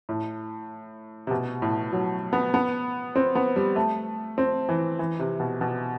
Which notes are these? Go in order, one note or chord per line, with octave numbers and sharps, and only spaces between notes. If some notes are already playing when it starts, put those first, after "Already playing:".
A2
C3
B2
A2
F#3
B3
B3
C4
B3
G3
A3
C4
E3
E3
C3
B2
B2